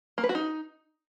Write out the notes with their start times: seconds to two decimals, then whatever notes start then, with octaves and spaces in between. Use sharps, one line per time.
0.18 A#3
0.23 B4
0.29 F#4
0.35 D#4